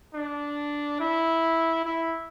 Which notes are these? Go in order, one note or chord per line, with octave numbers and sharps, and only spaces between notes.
D4
E4
E4